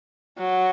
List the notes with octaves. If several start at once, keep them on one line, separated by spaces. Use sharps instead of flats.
F#3